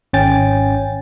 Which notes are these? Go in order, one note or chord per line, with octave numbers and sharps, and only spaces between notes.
G#1 C#4 G5 G#5 A6